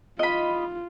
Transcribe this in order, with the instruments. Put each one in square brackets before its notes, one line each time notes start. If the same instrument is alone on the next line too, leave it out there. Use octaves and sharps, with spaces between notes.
[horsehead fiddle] F4 [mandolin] D#5 B5